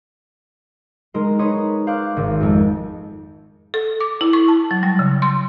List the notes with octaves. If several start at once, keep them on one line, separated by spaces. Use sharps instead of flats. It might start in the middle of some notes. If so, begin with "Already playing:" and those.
G#3 D#4 A#4 C6
D#4 B4 C#5 C6 D#6
C5 F5 D6 F#6
G#1
F2 G#3 A5
A4
D6
E4
C#6
A5
F#3
G3
C#3
C6